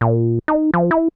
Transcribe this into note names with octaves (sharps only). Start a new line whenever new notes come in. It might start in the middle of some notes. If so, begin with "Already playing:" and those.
A#2
D#4
F3
E4